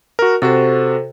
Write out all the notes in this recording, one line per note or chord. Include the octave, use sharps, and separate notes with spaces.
F#4 A#4
C3 F#4 A4 C5